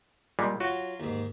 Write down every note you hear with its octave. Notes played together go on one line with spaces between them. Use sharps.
A#2 G3 G#3
F#3 F4 F#4
D#2 G#2